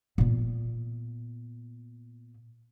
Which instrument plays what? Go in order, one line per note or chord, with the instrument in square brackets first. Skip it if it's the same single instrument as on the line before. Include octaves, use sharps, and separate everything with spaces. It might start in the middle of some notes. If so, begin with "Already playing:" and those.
[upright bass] A#2 B3